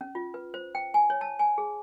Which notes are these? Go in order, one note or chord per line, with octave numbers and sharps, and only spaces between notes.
C#4
F4
B4
C5
G5
G#5
C#5
A5
G#5
G#4